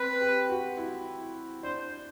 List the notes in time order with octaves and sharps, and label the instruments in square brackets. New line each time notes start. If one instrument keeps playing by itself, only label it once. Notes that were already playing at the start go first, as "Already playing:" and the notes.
Already playing: [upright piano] C4 [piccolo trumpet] B4
[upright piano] G4
F#4
E4
[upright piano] D4 [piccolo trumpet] C5